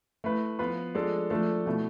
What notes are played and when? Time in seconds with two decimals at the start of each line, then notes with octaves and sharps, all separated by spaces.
0.24 A3 E4 B4
0.59 F3 B3 F4 B4
0.95 F3 G#3 D4 A4
1.30 F3 A3 D4 A4
1.66 B2 A3 E4